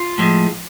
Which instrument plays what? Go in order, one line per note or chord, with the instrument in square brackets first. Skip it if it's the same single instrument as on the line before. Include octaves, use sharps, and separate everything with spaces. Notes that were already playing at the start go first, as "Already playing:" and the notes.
Already playing: [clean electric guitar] F4
A2 F3 G#3